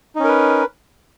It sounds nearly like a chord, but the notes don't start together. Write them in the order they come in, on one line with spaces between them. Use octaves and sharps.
D#4 C#4 A#4 B4